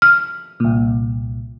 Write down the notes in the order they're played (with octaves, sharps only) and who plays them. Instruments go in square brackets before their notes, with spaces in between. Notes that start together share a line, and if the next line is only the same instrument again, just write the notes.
[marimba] F6
[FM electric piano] C2 A#2